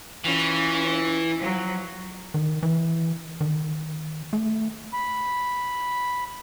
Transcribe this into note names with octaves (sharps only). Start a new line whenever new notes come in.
E3 C#4 F4
F3 F#3
D#3
E3
D#3
A3
B5